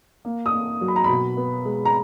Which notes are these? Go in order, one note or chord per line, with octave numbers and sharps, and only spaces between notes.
A#3
D#6
A#3
F#3
B5
A#5
B2 B5
B3
G#3
A#5